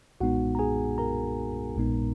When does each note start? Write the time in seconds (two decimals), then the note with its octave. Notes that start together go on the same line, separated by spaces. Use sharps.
0.21 B1 A#2 G#3 B3 D#4 F#4 F#5
0.55 A#5
0.59 G#4 G#5
0.98 A#4 A#5
1.76 A#1 A#2 G#3 B3 D#4